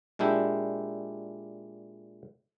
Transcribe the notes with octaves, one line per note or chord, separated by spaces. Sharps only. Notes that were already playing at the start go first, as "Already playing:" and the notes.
A#2 G#3 D4 E4 G4